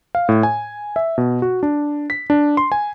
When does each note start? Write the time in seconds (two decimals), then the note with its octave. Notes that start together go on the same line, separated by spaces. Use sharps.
0.15 F5
0.29 A2
0.43 G#5
0.96 E5
1.18 B2
1.42 F#4
1.63 D4
2.10 B6
2.30 D4
2.57 C6
2.72 G#5